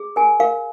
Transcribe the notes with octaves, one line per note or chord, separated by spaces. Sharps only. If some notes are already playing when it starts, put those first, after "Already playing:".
Already playing: G#4
A#4 G#5
A#4 F5